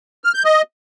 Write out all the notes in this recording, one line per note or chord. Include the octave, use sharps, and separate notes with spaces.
F6
G6
D#5